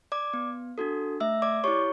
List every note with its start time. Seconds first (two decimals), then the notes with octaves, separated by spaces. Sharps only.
0.12 D5 D6
0.33 B3
0.78 D4 F#4 A4
1.20 A3 E5 E6
1.42 D5 D6
1.64 E4 G4 C#5 C#6